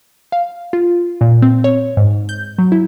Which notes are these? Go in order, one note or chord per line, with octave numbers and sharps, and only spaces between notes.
F5
F4
A#2
C4
C#5
G#2
G6
F#3
E4